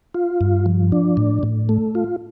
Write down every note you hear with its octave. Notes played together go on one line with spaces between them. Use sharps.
F4
G2
F3
D4
A2
A2
A3
F4